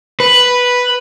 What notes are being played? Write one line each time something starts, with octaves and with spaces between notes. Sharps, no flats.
B4